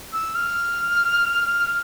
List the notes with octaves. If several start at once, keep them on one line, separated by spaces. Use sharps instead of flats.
E6
F6